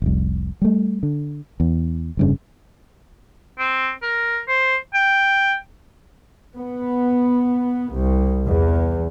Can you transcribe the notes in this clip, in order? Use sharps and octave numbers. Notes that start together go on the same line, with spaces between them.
F1 C2
G3 A3
D3
E2
F1 G2 C#3
C4
A#4
C5
G5
B3
C2
E2